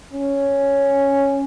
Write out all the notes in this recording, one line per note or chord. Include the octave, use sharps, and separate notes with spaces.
C#4